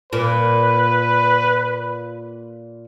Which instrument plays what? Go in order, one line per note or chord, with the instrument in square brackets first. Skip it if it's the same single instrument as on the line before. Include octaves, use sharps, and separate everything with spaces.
[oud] A#2 [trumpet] B4